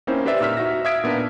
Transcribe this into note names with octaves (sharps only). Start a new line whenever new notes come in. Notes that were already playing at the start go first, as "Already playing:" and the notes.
A#3 C4 C#4 D#4 E4 C5
G4 B4 C5 D5 E5
A#2 D#4 E6 F6 B6
D#4 F#4 E5 A#6
E5 F5 D#6 G#6 B6 D7
A#2 B3 D4 D#4